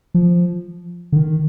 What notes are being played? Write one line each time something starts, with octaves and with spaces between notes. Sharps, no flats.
F3
D3
D#3